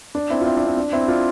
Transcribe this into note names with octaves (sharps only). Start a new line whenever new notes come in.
D4
C4 E4
F4
C4 E4
D4
D4
D4
C4 E4
D4 F4